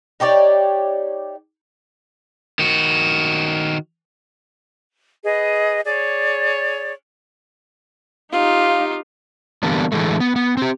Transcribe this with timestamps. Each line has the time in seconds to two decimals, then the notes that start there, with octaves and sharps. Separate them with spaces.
0.20 D#4 G4 C#5 D5
2.59 D#3 F#4
5.24 G#4 B4 D#5
5.85 G#4 C#5 D5
8.32 D#4 F4 G4 F5
9.63 D3 E3 G3 A#3 B3 D4
9.92 A2 D3 E3 G#3 A3
10.20 B3
10.36 B3
10.57 C4 G4